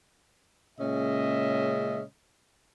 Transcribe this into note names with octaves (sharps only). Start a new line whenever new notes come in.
A#2 C#3 G#3 C#4 D#5 E5